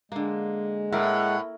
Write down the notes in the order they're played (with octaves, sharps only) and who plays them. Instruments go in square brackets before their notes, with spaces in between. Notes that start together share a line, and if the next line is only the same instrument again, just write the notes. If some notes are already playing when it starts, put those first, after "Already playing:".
[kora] D3 A#3 [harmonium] G#3
[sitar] A2 [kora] E4 A#4 [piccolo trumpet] F#5